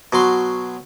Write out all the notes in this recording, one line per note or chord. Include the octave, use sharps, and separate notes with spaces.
B2 F#3 C6